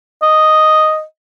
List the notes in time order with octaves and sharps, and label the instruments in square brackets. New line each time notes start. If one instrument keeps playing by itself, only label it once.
[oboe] D#5